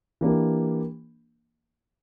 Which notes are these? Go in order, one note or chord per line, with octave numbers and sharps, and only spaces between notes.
E3 A#3 D4 G4